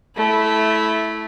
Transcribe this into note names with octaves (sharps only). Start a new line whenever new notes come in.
A3 E4